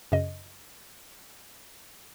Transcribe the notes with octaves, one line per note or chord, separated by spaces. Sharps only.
F#2 C#3 D#5